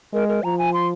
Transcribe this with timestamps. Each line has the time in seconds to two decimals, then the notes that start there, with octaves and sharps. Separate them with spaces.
0.13 G#3 A#4
0.29 A#4
0.43 F3 A#5
0.58 G#5
0.74 C6